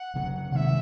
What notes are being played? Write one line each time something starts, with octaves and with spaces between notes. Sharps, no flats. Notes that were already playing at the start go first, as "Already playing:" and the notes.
Already playing: F#5
F#2 C#3 F#3
C3 D#3 G#3 C4 E5 F#5